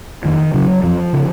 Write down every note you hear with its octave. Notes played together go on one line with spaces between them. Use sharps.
F2 D#3
C#3 F#3
F2 F3
C#3